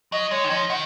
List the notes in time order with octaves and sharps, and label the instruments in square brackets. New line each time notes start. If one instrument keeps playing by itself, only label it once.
[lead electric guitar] F#3 [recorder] D#5
[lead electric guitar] G#3 [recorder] C#5
[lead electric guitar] D#3
[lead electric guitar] F3 [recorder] D#5
[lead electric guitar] D#3 [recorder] F#5